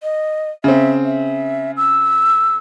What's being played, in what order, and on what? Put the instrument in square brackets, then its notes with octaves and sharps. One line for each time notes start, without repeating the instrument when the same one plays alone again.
[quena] D#5
[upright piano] C#3 C4 [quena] E5
[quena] E5
E6